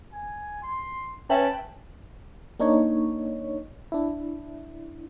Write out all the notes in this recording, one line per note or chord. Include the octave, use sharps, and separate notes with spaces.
G#5
C6
C#4 B4 E5 G5 A5
A#3 D4 D#4 C#5
D4 E4